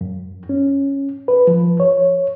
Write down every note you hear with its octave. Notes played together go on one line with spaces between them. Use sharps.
F#2
C#4
B4
F3
C#5